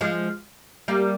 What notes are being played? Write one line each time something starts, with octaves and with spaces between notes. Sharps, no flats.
F3 G#3
G3 A#3